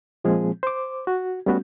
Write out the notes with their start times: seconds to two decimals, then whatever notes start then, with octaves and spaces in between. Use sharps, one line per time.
0.24 A#2 F3 G#3 C4 G#4
0.63 C5 D6
1.07 F#4
1.46 G3 A3 B3 C#4 F#4